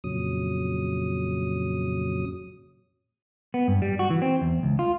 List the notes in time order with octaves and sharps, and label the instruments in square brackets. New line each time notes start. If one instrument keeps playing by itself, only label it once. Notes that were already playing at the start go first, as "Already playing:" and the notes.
[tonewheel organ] F2 A#2 C#3 F#3 D#6
[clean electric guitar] B3
G2
G3
F#4
E3
C4
E2
C#2
F4